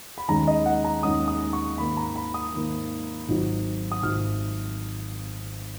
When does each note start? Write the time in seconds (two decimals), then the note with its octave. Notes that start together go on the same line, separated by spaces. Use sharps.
0.18 B5
0.28 D#2 D#3 G#3 C#4 A#5
0.48 D#5
0.66 F#5
0.85 A#5
1.03 D#2 D#3 G#3 C#4 D#6
1.28 D#6
1.53 C#6
1.78 G#2 D#3 A#3 B5
1.97 A#5
2.16 B5
2.34 D#6
2.53 G#2 D#3 A#3
3.28 G#1 G#2 F#3
3.92 D#6
4.03 G#1 G#2 F#3 F6